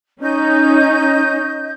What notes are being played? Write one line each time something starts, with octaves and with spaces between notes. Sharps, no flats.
C#4 D#4 D#5 G6